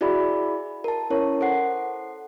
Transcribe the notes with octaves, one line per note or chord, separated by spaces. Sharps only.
E4 F#4 G#4 D5 E5 B5
A#4 A5
C#4 E4 A#4 C#5
A4 C5 F#5 C7